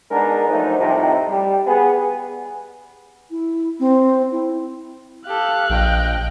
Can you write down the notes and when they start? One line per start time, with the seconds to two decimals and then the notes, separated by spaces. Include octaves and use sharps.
0.11 G#3 B3 D4 D#4 G#4 A#4
0.48 F3 F#3 A3 D4 D#4
0.79 C2 F2 A2 C3 F3 D#4
1.28 G3
1.67 B3 G#4
3.31 E4
3.80 C4
4.32 E4
5.27 G4 A4 F5 F#6
5.70 A#1 D#5 G5